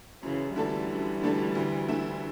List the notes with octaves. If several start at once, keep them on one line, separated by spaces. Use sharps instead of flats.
F#2 C#3 E3
D3 E3 G3 A3 D4 A4
F#2
D3 A3 D4 A4
D2
D3 A3 E4